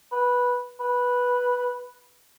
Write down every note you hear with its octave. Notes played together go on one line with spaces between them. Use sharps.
B4
B4